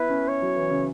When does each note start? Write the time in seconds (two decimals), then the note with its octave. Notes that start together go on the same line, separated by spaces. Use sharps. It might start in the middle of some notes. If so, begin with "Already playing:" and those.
Already playing: B3 E4 B4
0.09 C#4
0.28 C#5
0.42 F#3
0.56 E3
0.70 C#3